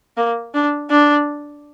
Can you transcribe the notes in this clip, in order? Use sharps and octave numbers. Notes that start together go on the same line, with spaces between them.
A#3
D4
D4